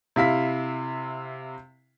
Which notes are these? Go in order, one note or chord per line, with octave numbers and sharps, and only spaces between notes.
C3 E4 F5 B6